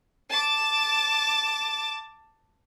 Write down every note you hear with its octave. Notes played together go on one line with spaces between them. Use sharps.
A5 D6